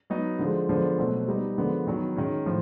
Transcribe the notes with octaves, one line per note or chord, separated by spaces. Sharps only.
F#3 B3 D#4
D3 F3 G#3
D3 F3 G#3 B3
B2 F#3 A3 C4
G3 B3 D#4
D3 F3 G#3 B3
D#3 F#3 B3
D#3 G#3 C#4
A2 F3